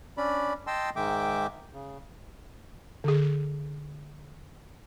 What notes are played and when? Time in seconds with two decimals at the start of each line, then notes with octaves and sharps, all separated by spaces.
0.18 C#4 D4 D5 B5
0.67 D#5 G5 A5 C6 E6
0.96 G#2 D#3 G#3 E5 G5 D6
1.73 C#3
3.04 D3 G#4